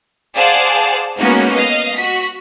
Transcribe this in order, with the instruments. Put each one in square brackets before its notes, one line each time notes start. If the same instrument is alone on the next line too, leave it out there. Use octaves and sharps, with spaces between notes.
[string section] G#4 C5 D5 F5 F#5 A5
G#3 A#3 B3 C#4 D#4 F#4
D#5 F5
F#4 B6